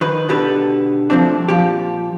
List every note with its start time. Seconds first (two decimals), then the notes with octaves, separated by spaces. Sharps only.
0.01 D#3 B4
0.29 B2 D3 G4 A4 B4
1.10 C2 F3 A3 C4 D4
1.48 A#2 F3 G4